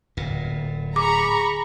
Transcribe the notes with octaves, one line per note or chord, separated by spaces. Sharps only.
D1 A#2
G#4 A#5 B5 C#6 D6